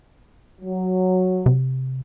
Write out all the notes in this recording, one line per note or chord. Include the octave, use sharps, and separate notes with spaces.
F#3
C3